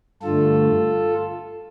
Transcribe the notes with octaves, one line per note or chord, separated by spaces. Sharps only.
G2 D3 A3 F4 A4